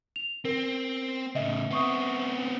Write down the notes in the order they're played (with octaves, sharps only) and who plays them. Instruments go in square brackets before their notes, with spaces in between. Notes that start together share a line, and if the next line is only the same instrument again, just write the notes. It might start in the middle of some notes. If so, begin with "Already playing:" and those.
[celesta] F7
[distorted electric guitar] C4 [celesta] A#4
[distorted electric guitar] A2 C#3 [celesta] D#5 E5
[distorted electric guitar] B3 C4 [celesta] E5 C#6 D#6